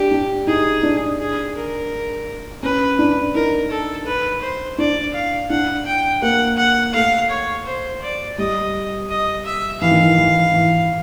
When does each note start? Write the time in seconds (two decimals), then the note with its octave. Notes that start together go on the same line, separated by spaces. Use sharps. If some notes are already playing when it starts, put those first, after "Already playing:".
Already playing: D4 G4
0.11 D4
0.47 D#4 G#4
0.83 D4
1.19 G#4
1.55 A#4
2.63 C#4 B4
2.99 D4
3.35 D#4 A#4
3.71 A4
4.07 B4
4.42 C5
4.78 D4 D5
5.14 F5
5.50 D4 F#5
5.86 G5
6.22 A#3 F#5
6.58 F#5
6.94 A3 F5
7.30 C#5
7.66 C5
8.02 D5
8.38 G3 D#5
9.09 D#5
9.45 E5
9.81 E3 F5
9.91 D#3
10.00 E3
10.18 E3
10.54 E3